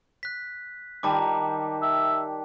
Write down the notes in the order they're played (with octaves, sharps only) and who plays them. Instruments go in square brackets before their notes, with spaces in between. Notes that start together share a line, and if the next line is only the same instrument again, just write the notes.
[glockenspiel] F#6 B6
[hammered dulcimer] D#3 G3 [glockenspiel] A5 D6
[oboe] E5